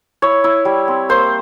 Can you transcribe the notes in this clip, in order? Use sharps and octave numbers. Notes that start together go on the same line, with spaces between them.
E4 C#5
E4
G3
C4
A#3 C5